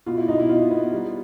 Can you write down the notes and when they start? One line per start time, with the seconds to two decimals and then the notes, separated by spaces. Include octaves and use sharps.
0.06 B2 F4
0.17 E4
0.28 B2 D#4
0.39 E4
0.49 B3 F4
0.70 B3
0.92 G3